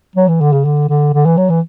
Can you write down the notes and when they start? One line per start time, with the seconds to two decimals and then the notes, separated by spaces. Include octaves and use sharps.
0.16 F#3
0.28 E3
0.41 D3
0.53 C#3
0.65 D3
0.89 D3
1.14 D3
1.26 E3
1.37 F#3
1.50 E3